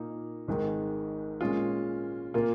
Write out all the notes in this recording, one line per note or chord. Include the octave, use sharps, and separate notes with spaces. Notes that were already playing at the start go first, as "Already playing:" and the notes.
Already playing: A#2 A#3 D#4
G#1 G#2 D#3 G#3 D#4
A#2 G#3 C#4 F4
A#2 A#3 F4